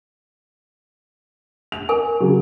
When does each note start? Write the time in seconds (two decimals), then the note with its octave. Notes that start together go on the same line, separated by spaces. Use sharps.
1.72 F7
1.89 A#4 G#5
2.20 C#3 F#3